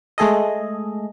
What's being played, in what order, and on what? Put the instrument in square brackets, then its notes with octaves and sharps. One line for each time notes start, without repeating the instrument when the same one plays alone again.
[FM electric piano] G#3 A3 G#4 A4 D#5